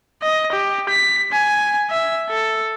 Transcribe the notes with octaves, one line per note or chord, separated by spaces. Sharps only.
D#5
G4
B6
G#5
E5
A4